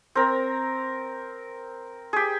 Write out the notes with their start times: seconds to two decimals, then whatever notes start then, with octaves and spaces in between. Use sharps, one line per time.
0.15 C4 A#4
2.13 G4 G#4